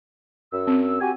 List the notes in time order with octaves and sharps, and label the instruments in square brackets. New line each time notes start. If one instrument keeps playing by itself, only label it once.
[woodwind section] F#2 E6
[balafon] C4
[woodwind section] F#4 G4 G#5